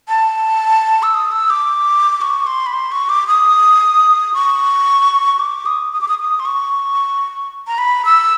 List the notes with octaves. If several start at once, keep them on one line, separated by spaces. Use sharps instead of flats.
A5
E6
D#6
E6
D6
C#6
C6
B5
C6
C#6
D6
D#6
C#6
D6
D#6
D#6
D6
D#6
D#6
C6
C#6
A#5
B5
E6